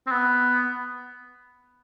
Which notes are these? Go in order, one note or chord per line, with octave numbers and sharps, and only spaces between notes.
C4
B3